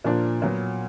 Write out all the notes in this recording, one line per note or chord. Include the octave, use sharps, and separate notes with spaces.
A#2 F3 A#3 D4 F4
A#2 F#3 B3